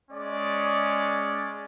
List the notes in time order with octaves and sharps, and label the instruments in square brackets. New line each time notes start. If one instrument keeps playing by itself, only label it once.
[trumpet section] G#3 C#4 D5